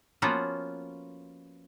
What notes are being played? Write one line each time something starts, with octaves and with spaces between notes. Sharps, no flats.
F3 A#3 B3 C#4 F4 F#4